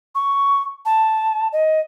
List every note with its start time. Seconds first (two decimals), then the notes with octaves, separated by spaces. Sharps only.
0.15 C#6
0.85 A5
1.53 D#5